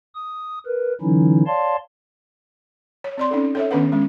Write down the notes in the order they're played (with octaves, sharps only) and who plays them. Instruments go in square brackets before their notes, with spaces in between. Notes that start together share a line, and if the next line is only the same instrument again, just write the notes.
[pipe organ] D#6
A#4 B4
D3 E3 F#3 C#4 D#4 E4
C#5 D5 F5 A5 C6
[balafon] C#5
C4 D5 C6
C#4 D#4 A4
A4 C#5 E5
D#3 B3 C#4 D4 B4 F#5
G#3 C#4